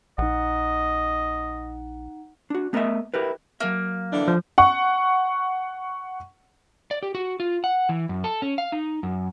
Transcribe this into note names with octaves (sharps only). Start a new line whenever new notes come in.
A#1 D#4 D#5 F#5
D4 F#4
A3 B3 A#4 B4 D#5 E5
E4 G4 A#4 B4
F#3 A#3 A#4 E5
D3 E3 D4
F3
F#5 C#6
D5
G4
F#4
F4
F#5
E3
F#2
A4
C#4
F5
D#4
F#2